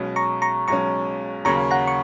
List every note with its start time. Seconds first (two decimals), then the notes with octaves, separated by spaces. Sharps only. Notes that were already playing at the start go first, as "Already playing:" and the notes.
Already playing: B1 B2 G#3 C#4
0.16 A#5 C#6
0.42 A#5 C#6
0.68 B1 B2 G#3 C#4 A#5 C#6
1.45 D#2 C#3 F#3 A#3 C#4 A#5 C#6
1.71 F#5 A#5
1.87 C#6